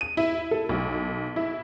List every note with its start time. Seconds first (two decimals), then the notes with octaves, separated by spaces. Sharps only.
0.01 D#7
0.17 E4
0.51 A4
0.69 B1
1.36 E4